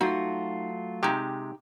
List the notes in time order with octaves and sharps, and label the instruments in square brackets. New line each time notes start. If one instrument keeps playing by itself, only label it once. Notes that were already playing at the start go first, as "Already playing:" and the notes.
[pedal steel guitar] F#3 A3 F4 [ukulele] D#4 [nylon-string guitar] F#4
[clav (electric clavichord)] C3 G#3 [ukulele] D#4 G4